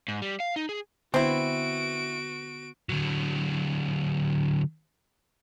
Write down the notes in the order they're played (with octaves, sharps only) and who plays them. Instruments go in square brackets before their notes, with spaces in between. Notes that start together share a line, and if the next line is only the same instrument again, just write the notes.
[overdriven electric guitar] G#2
G3
F5
D#4
G#4
[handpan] D3 B3 [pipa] C4 E4 [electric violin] F#4 D7
[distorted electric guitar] D3 F#3